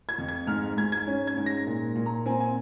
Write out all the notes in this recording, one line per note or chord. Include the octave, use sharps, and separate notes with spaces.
G#6
F2
G#6
G#2 F6
G#2 G#6
G#6
C#4
G#6
G#2
A#6
A#2
A#2
A#5
C4 G#5
G#5